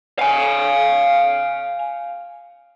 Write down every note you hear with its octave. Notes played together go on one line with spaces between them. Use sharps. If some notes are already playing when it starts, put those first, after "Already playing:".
F5 G#5